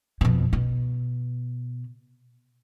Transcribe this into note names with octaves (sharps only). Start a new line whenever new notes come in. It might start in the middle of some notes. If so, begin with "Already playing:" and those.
F2 B2
B2